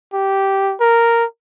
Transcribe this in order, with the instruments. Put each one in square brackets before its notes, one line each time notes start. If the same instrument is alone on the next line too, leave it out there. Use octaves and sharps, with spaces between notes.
[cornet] G4
A#4